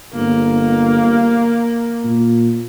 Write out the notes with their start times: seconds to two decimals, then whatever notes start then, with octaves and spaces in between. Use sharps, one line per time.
0.13 G1 A#3
2.04 A#2